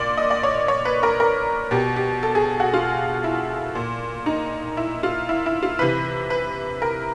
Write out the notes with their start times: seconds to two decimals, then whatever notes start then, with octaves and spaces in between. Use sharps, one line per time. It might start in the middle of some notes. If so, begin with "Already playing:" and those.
Already playing: A#2 D5
0.17 D#5
0.31 D5
0.43 C#5
0.68 C#5
0.85 B4
1.03 A#4
1.20 A#4
1.71 B2 G4
1.96 G4
2.23 A4
2.35 G#4
2.60 F#4
2.74 F4
3.24 E4
3.75 A#2
4.26 D#4
4.77 E4
5.03 F4
5.29 E4
5.46 E4
5.63 F4
5.79 C3 E3 B4
6.30 B4
6.82 A#4